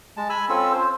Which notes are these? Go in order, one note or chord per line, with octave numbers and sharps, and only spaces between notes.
G#3 A5
G#5 B5 E6
C4 C#4 F4 A4 E6
C5